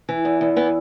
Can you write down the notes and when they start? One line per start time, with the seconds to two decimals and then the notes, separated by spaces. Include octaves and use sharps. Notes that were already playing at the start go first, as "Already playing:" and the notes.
0.09 E3
0.25 E2
0.41 E2
0.56 E3 B3